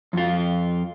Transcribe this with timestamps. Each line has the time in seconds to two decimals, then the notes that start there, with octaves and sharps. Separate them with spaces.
0.13 F2 F4